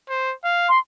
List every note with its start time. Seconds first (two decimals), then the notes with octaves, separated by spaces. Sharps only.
0.09 C5
0.44 F5
0.69 C6